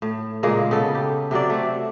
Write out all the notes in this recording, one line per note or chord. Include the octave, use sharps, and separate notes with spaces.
A2
A#2 C#3 G#3 A#3
C#3 B3 A4
G4
C3 F#3 F#4 D5
A3 C4